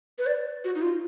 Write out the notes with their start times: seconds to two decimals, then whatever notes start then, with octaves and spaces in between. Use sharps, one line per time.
0.18 B4
0.26 D5
0.65 F#4
0.76 D#4
0.82 F4